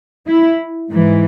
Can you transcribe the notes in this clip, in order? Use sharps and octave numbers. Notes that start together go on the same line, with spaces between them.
E4
G#2 E3